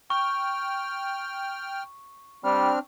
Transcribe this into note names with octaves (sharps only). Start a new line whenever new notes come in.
G5 C#6 F6
G3 C4 D4 F6